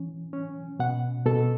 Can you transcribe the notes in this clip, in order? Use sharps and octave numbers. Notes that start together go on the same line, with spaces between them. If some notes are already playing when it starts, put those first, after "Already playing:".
Already playing: E3 C#4
C#4
B2 F#5
B2 A4